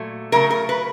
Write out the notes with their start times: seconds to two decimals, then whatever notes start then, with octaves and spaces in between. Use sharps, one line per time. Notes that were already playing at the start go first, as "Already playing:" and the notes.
Already playing: A#2 F#3 A3
0.32 C#3 F#3 A3 A#4
0.51 A#4
0.69 B4